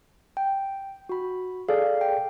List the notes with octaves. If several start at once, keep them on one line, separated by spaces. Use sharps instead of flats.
G5
F#4 B5
G#4 A4 D5 F5
G5